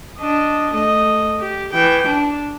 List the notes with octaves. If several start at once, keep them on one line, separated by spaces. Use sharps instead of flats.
D4 D#5
A3 D#5
G4
E3 G5
D4